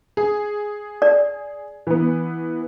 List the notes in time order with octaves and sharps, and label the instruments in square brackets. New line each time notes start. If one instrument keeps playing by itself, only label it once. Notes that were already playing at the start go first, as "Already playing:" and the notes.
[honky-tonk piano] G#4
[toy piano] D5
[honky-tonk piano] E3 B3